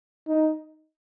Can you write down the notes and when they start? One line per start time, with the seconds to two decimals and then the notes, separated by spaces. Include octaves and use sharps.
0.27 D#4